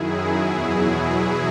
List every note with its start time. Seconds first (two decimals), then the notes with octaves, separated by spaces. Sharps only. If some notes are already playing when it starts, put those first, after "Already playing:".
Already playing: F#2 D#3 F#3 E4 G#4
0.40 E2 B2 F#3